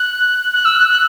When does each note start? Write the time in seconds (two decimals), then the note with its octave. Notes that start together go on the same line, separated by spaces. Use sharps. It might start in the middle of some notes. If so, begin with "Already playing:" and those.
Already playing: F#6
0.53 F#6
0.64 E6
0.75 F#6
0.88 F#6